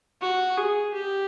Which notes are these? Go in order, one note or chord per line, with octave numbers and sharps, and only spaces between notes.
F#4
G#4
G4